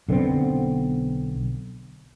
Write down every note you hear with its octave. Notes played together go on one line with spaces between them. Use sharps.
B1 D3 B3 C4